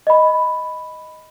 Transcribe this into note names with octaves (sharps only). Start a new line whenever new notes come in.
D#5 B5